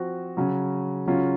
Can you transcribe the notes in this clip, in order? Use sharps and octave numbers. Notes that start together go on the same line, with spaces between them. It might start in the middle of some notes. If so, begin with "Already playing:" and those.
Already playing: F3 C4 F#4
C#3 F#3 C#4
C#3 F#3 C#4 F4